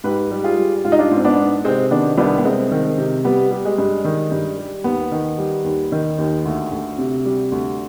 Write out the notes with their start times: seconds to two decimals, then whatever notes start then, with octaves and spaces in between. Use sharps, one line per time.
0.04 G#2 G4 B4
0.31 G3
0.44 F4 G#4
0.58 G3
0.84 G#2 F4
0.92 D#4
0.99 D4 F4
1.11 G#2
1.17 C4
1.24 B3 D4
1.38 G#2
1.65 C3 G#3 C4
1.91 D#3 B3 D4
2.18 C2 B3 D4
2.38 B3
2.45 C2 G#3 C4
2.71 D#3
2.98 C3
3.25 G3 B3
3.51 G3
3.65 G#3
3.78 G2
4.05 D#3
4.32 G2
4.58 G3
4.84 D#2 B3
5.12 D#3
5.38 G3
5.64 D#2
5.92 D#3
6.18 D#2
6.45 D2
6.71 D2
6.98 C3
7.25 G3
7.52 D2